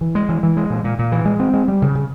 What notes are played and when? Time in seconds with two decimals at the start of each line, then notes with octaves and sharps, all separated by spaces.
0.01 E3
0.15 G#3
0.29 E3
0.43 E3
0.57 G#3
0.70 A#2
0.84 A#2
0.99 A#2
1.12 E3
1.25 G#3
1.40 C4
1.54 G#3
1.68 G3
1.82 C#3
1.95 C#3